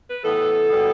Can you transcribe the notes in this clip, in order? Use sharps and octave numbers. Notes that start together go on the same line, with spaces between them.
B4
A2 E3 B3 A4
B2 G3 B3